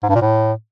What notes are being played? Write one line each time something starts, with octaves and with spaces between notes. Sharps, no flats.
G#2
G2
A#2
A2